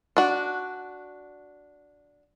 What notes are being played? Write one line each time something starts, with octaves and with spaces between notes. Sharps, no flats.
D4 F#4